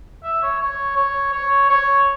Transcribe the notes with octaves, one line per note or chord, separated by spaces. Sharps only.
E5
C#5
C#5
C#5
C#5
C#5